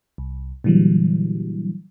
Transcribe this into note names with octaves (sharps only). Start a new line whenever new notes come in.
C2
A#2 D3 E3 F#3 G3